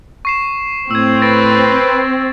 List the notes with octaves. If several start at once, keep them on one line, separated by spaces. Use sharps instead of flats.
C#6 C7 E7
A2 C4 E6 G#6
B4 A6 A#6 D7